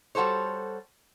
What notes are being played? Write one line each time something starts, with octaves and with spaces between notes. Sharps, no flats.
G3 F#4 A4 C5 C#5